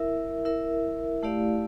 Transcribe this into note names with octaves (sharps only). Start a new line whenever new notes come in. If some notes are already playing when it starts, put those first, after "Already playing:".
Already playing: E4 A#4 E5
E4 A#4 E5
A3 E4 G4 D5 F5